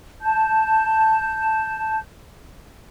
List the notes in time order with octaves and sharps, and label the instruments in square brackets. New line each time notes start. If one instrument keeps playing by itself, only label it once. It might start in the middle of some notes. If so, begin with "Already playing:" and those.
[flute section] A5 G6